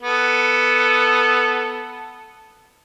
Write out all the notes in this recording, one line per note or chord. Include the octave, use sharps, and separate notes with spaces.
B3 A4